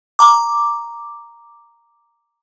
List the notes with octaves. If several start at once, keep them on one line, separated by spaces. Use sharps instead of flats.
A#5 D6